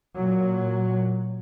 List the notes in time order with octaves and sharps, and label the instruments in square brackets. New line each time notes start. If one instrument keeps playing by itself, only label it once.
[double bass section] A#2 F#3